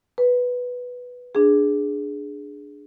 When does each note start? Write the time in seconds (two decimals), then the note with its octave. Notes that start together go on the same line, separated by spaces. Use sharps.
0.18 B4
1.35 D4 G#4